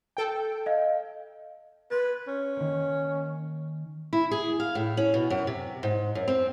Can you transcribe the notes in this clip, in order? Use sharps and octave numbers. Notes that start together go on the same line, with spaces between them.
A4 G5
D#5 F5
B4 C6 G#6 A6
C#4
D#3 A#3
E4
G#4
F5
A2
C#4
B2
F#2
C3
G#2
F#2
C4